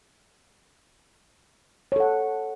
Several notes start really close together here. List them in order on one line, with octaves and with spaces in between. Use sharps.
C#5 A4 F#5